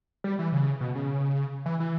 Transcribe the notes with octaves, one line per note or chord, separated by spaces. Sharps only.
G3
E3
C#3
B2
C#3
E3
E3